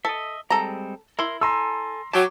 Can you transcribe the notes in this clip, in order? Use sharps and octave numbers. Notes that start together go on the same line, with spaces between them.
A4 D#5 E5
G3 G#3 C4 A4 A#5
E4 A#4 C6
A4 G#5 A#5 C6 E6
F#3 G4 G5 A5